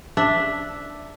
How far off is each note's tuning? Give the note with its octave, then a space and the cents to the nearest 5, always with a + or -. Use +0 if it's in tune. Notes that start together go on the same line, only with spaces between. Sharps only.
D4 +0 E5 +0